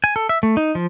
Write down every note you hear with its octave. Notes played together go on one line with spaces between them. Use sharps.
G#5
A4
E5
A3
D#4
F3